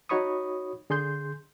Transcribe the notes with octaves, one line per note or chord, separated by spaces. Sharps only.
D#4 F#4 C#5 B5 C#6 D#6
D3 G#4 C6 G6